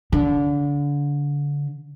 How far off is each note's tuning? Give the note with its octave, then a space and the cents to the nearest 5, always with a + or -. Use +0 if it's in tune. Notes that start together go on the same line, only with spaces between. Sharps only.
D3 -30